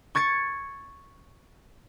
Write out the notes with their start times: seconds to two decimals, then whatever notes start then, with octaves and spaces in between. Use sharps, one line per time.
0.15 C#6 G#6 A6 C#7